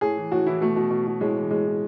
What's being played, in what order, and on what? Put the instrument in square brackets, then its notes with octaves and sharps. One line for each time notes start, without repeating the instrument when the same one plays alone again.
[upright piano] A2 G#4
E3
A2 F#4
E3 E4
B2 A3
B2
B2
B2
A2 G#3
E3
A2 G#3
A2